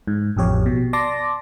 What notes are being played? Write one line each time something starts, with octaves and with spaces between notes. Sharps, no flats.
G#2
A1 F2 G4 C#5
B2
D5 A5 C6 D6 A#6